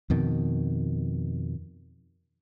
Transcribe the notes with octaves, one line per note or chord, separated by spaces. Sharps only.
F2 B2 D#3